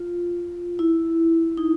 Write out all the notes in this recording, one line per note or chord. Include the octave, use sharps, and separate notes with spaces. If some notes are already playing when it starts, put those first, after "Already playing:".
Already playing: F4
E4
D#4